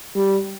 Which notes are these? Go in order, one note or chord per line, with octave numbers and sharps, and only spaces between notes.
G3